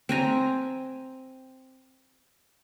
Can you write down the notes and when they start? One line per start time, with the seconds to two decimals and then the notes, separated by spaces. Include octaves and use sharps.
0.09 C4 G#5 A#5